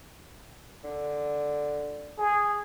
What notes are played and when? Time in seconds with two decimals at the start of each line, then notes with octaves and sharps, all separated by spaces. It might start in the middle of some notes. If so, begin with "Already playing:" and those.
0.84 D3
2.18 G#4